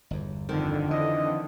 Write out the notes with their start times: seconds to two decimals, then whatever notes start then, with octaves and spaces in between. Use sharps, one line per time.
0.11 G1 E2
0.49 F2 D3 D#3
0.91 E3 D#5